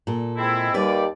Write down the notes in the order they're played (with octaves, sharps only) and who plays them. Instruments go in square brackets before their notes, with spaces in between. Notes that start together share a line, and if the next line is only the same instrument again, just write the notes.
[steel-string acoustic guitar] A#2 A4
[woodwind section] G#3 C4 E4
[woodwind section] D#2 D5 [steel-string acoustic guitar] G3 B4